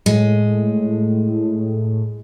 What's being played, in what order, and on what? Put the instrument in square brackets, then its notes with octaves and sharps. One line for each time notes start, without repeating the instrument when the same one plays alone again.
[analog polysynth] A2 [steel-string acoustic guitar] G#3